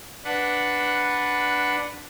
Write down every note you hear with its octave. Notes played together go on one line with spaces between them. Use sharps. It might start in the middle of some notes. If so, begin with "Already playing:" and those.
D4 B4 F#5